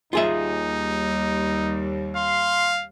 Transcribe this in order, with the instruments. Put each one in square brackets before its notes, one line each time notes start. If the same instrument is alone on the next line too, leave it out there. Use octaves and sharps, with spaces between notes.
[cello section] D#2 G3 [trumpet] D#4 [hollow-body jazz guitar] F4 G#4 E5
[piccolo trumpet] F5 [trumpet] C6